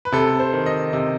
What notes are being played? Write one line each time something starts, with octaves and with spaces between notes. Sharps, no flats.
B4
C3 A4
C5
D#3
D#5
C3